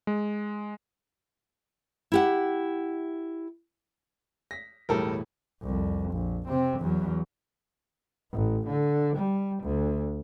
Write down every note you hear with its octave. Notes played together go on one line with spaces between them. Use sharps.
G#3
E4 G4 F#5
A#6 B6
E1 A2 G3 A4 A#4
C2 F2
A#1
C3 C4
E2 F#3
A1
D3
G3
D2